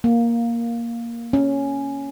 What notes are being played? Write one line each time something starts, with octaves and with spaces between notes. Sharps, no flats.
A#3
C#4